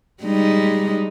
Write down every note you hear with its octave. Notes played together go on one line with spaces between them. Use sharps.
G3 G#3 D#4